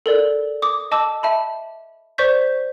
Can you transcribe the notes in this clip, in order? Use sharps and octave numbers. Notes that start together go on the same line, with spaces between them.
A4 A#4 D5
D6 D#6
D#5 A5 D6 E6
E5 A5 B5
C5 D5 C#6 G6 B6